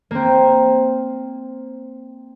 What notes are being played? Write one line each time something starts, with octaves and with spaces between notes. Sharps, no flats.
A#3 C4